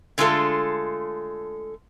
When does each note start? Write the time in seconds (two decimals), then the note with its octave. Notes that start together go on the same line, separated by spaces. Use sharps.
0.18 D3 G#3 A3 F4 A4